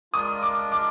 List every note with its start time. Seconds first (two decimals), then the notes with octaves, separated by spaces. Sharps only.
0.14 G#3 D4 F4 A#4 D#6
0.42 D6
0.72 D6